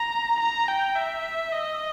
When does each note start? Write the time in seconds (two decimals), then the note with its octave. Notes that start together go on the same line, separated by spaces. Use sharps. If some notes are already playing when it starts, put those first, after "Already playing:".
Already playing: A#5
0.40 A#5
0.68 G5
0.96 E5
1.52 D#5